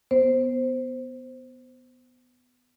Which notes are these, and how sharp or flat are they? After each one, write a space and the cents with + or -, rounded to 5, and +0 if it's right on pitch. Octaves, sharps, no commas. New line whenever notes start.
B3 +10 C5 +0